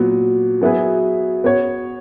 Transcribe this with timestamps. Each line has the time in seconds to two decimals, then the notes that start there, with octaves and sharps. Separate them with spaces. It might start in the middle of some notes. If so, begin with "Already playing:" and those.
Already playing: A#2 F#3 B3
0.62 F#3 B3 E4 G#4 B4
1.44 B3 F#4 C#5